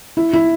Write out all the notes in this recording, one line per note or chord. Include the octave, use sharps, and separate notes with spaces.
E4
E4